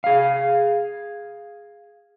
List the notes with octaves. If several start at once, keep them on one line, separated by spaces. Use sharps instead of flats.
G#4 F5